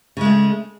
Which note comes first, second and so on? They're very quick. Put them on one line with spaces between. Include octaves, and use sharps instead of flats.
C#3 G#3 A3